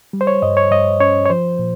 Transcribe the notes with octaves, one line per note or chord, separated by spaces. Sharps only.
G3
C5
C#5
G2 D#5
C#5
G2 D#5
C#4 C#5
C#5
F3 C5
A#2